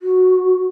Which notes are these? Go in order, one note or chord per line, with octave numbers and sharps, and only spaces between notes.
F#4